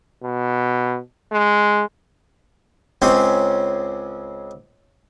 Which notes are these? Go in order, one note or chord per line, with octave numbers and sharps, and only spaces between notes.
B2
G#3
C#2 C#3 C4 C#4